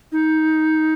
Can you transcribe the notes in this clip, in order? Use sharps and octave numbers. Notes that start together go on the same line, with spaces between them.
D#4